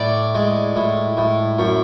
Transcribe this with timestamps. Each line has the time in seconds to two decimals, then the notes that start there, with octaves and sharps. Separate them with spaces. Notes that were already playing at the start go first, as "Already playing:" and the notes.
Already playing: A2 D5
0.35 G#3
0.76 A2
1.17 A2
1.59 F#2